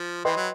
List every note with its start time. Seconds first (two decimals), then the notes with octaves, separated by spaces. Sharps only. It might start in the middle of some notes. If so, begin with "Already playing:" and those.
Already playing: F3
0.25 E3 B4 D#5 G5 C6
0.36 F#3